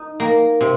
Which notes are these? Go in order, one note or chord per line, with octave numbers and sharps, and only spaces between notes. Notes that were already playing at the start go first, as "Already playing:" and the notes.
Already playing: D#4
A#3
C3